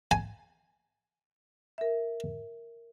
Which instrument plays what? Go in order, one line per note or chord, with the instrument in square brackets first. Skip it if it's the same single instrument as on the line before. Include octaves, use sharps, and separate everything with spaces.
[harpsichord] G#5
[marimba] A#4 E5